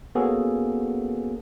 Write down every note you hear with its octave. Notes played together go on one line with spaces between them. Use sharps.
A#3 B3 C#4 F#4 G#4 A4